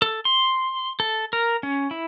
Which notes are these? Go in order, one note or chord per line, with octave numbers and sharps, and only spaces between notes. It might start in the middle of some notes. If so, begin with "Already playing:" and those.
A4
C6
A4
A#4
C#4
E4